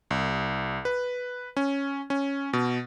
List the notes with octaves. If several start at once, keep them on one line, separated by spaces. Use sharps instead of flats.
C2
B4
C#4
C#4
B2